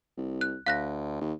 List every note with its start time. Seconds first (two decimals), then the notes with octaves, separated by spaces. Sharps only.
0.17 C2
0.41 F#6
0.66 D2 F5 F#6 A#6
1.21 D#2